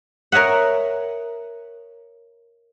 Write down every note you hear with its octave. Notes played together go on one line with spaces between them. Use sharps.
A#4 C#5 D#5 E5 F#5